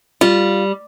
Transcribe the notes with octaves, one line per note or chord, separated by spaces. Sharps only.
G3 F4